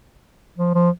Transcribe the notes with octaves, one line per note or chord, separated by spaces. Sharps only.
F3
F3